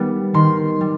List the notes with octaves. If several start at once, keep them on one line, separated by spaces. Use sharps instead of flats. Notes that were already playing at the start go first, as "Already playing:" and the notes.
Already playing: D#3 G3 B3
D#3 C6
G3